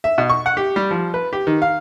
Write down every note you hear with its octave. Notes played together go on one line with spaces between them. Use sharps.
E5
B2
C#6
F#5
G4
G3
F3
B4
G4
D#3
F5